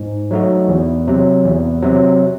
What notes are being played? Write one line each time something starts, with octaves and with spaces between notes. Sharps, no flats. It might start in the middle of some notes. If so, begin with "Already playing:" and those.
Already playing: G#2
F#3 A3 D#4 F#4
E2
C3 F#3
E2
C3 F#3